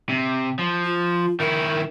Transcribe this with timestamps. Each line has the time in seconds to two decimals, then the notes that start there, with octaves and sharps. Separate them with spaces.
0.09 C3
0.59 F3
0.85 F4
1.40 D#3 E4 A#4